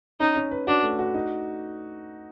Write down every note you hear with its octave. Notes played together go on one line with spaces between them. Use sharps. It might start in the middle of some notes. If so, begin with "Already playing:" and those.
C#4 D#4
C#4
B4
D4 F#4
A3
F#4
D#4